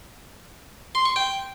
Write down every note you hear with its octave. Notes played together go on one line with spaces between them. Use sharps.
C6
C#6
G5